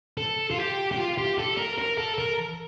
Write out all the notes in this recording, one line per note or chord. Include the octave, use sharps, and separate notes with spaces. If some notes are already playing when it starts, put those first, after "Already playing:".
A4
F4
G4
G4
F4
G4
A4
A#4
A#4
A4
A#4